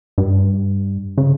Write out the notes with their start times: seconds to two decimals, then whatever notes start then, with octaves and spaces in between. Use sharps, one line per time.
0.18 G2
1.18 C#3